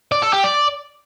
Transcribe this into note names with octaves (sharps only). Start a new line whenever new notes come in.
D5
A4
G4
D5